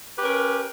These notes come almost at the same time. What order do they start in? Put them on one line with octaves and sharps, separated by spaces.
G4 B4 C#4 A#4